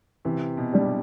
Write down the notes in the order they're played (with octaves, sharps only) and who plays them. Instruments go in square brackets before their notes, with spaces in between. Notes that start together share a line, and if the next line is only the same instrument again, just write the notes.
[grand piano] C3 [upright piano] E3
[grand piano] B2
[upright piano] G3 D4 G4